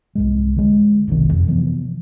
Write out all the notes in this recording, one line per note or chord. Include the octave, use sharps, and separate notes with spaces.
C2 G#2 G#3
D3 G#3
F#1 B1 C3 D#3
F2
C3 E3 F3 B3